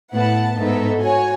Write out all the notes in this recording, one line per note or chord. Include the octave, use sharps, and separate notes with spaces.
A2 B3 E4 B4 F#5 A5
G#2 B3 D#4 A4 E5
F#4 C#5 G#5